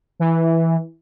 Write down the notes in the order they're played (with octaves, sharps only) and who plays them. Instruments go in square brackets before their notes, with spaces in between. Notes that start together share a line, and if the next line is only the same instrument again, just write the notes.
[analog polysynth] E3